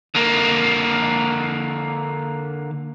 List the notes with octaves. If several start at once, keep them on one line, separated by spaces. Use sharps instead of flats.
D3 A#3